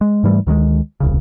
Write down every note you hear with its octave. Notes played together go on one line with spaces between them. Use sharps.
G#3
G#2 E3 G3 A3
D2 D#3 F#3 G#3
D#1 C2 C#3